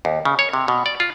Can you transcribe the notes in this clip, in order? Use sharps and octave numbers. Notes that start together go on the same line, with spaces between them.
D#2
C#3
C#5
C3
B2
D5
F4